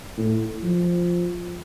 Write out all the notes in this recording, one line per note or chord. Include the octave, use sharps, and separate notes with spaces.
A2
F3